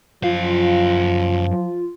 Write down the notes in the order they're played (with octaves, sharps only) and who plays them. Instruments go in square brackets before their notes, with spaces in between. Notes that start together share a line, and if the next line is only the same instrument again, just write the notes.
[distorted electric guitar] F#2 F5 [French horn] F3 [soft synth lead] F4